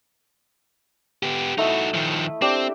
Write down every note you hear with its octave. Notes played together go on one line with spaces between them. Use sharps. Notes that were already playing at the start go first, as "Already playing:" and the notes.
B3 G4
A3 D#4 E4 F#4 D#5
D#3 F3
C4 D4 G4 G5